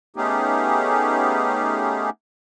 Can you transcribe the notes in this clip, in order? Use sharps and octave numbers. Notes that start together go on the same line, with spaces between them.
A3 B3 C#4 D#4 G4 G#4